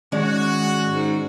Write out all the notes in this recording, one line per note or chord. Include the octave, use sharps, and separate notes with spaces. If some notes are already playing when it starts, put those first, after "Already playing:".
D#3 G#3 C#4 F#4 D5
G#2